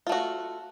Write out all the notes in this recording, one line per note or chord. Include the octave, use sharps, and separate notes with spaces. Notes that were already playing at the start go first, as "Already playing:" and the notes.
A3 F4 F#4